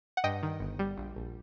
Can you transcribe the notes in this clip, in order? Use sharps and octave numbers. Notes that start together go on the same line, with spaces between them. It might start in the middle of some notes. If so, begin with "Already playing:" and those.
F#5
G2 D#5 G5
D#3
G1
G3
A#1
A#1